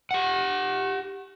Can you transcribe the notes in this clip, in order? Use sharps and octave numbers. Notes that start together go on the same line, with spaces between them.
G4 F#5